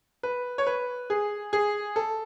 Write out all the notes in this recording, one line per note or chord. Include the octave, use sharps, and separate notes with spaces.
B4
C#5
B4
G#4
G#4
A4